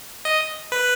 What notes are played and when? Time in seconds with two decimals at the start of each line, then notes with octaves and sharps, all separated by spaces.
0.25 D#5
0.72 B4